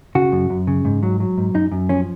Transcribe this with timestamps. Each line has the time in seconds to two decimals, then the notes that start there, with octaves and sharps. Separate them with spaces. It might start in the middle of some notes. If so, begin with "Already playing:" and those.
0.15 C#3 F#4
0.32 F#2
0.50 F#2
0.67 C#3
0.85 G#2
1.03 F#3
1.20 F#3
1.38 G#2
1.54 F#2 D#4
1.72 F#2
1.89 F3 C#4